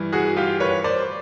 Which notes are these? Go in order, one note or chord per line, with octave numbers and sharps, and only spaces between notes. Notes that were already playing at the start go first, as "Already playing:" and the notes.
Already playing: G2 E3
F#4 G#4
F4 G4
B4 C#5
C5 D5